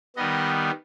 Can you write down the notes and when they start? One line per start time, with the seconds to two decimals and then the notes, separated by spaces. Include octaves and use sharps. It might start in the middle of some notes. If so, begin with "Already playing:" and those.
0.16 D#3 G3 B3 D#5